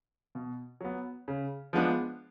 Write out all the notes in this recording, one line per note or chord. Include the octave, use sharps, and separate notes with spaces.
B2
F#3 B3
C#3
F3 G#3 B3 D4